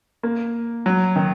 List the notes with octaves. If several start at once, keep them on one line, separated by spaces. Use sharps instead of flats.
A#3
F#3
D#3